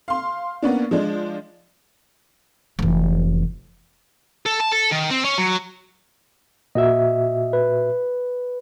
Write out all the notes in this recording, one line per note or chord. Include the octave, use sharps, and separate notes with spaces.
F5 C6
A#3 B3 C#4 D4
F3 G#3 D4
F1 E3
A4
A5
A4
D#3
C4
C#4
F#3
A#2 F#4 D#5 E5
B4